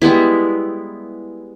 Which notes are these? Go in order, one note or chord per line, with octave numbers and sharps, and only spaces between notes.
G3 G#3 B3 E4